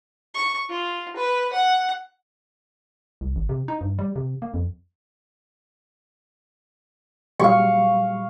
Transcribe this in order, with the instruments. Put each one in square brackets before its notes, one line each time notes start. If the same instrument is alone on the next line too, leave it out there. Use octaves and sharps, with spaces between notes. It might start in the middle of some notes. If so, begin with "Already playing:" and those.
[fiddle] C#6
F4
B4
F#5
[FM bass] C2
G#1
C3
D#4
G2
G3
C3
A#3
F2
[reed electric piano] A#2 F#3 G3 [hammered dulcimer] F5 C#6